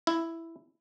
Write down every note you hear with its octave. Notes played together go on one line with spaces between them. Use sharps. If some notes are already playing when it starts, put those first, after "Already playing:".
E4